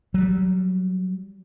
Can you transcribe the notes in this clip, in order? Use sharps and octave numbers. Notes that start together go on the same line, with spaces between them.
F#3 G3